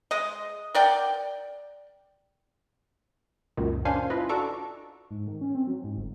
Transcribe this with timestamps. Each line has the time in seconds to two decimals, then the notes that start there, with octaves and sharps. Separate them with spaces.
0.11 G#3 D#5
0.74 A#4 D5 F#5 G5
3.57 C#2 F#2 A#2 D#3
3.85 C#4 D4 C5 F5 G#5 C6
4.10 E4 F4 B4 D#5
4.29 D4 F#4 A4 A#5 C#6 D6
5.11 G#2
5.27 D#3
5.41 C#4
5.55 C4
5.67 F#3
5.84 G#2
5.97 G1